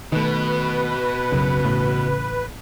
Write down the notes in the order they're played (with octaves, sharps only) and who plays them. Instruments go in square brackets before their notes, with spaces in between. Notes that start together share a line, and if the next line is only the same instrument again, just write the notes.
[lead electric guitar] B2 [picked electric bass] D#3 A3 [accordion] B4
[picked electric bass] B1 F#2 [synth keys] C#3
[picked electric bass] A1 A2